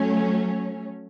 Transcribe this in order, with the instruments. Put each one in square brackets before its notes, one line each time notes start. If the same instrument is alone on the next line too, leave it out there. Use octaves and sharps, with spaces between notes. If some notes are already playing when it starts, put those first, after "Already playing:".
Already playing: [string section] F#3 A3 C#4